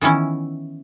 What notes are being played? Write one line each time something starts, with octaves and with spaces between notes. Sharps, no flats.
D#3 E3 B3 C#4 E4